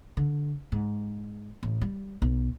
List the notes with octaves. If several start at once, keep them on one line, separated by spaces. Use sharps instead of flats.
D3
G#2
A1
G3
B1